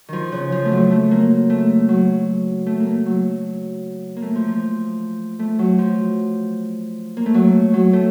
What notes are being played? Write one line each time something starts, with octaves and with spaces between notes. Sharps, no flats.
D#3 F3
C#3
F3
A3
F#3
A3
A#3
A3
F#3
A3
A#3
A3
F#3
A#3
A3
F3
F3
A3
F#3
F3
A#3
A3
F#3
F#3
A3